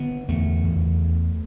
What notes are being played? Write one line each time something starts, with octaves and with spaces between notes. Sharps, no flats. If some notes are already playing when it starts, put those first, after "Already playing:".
Already playing: D3 B3
E2 A3
E2